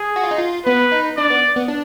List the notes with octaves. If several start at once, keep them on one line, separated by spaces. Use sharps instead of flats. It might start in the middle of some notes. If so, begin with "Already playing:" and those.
Already playing: G#4
F#4
F4
D#4
F4
B3 B4
D#4
D4 D5
B3
B3
D4